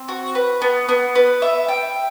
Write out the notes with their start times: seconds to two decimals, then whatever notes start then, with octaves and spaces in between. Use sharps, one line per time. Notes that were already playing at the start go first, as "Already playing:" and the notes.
Already playing: C4
0.08 F#4
0.35 B4
0.62 B3
0.89 B3
1.15 B4
1.42 E5
1.69 G5